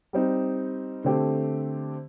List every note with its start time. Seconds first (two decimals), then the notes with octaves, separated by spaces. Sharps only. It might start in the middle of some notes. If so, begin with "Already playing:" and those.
0.13 G3 C4 D#4
1.04 D3 A3 C4 G4